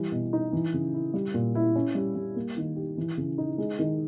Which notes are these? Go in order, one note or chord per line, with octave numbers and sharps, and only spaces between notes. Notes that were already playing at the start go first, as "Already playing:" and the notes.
Already playing: E3 G3
B2
D#4
E3
C#3
E4
G3
A#2
E4
C#4
G3
G3
A#3
D#3
G4
E3
C#3
D#4
G#3
D#3